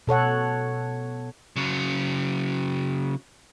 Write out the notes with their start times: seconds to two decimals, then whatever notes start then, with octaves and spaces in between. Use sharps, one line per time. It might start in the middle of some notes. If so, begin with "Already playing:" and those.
0.07 B2 A4 C#5 F#5
1.56 C#3 F#3